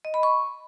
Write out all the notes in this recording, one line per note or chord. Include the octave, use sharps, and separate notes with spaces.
D#5
B5
C#6